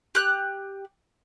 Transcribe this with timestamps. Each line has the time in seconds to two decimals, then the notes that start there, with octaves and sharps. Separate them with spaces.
0.15 G4 F#6